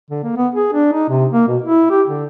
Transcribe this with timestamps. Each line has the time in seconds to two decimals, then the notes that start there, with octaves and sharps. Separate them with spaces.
0.11 D3
0.23 A#3
0.37 B3
0.55 G#4
0.73 D4
0.93 D#4
1.09 C3
1.33 A#3
1.48 B2
1.62 E4
1.90 G4
2.08 D3